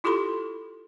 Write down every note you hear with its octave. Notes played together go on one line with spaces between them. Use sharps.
E4 F4 G4 A4 B5 C6